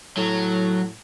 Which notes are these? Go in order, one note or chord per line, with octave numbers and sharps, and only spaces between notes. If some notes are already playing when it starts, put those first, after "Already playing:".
A2 F#3